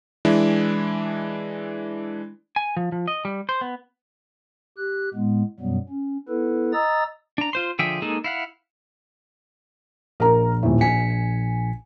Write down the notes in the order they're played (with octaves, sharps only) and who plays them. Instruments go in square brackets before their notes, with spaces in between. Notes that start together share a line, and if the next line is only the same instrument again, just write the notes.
[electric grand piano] E3 G#3 D4 E4
[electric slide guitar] G#5
F3
F3
D#5
G3
C5
B3
[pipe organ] G4 F#6
A2 G#3 B3
F#2 B2 F#3 G3 B3
C#4
B3 E4 A4 B4
D#5 A#5 D#6 E6 A6
[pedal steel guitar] D4 A#5
F4 C5 C6
D3 F3 G#4 E5 G5
G#3 A#3 D#4 G#4 A4
E4 F5 F#5
[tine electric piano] A#1 [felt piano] A#4 A#5
[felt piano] D#1 A2
[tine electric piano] A#1 B6 C#7 [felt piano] G#5